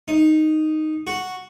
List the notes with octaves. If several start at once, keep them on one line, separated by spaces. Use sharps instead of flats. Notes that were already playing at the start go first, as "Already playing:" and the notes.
D#4
F#4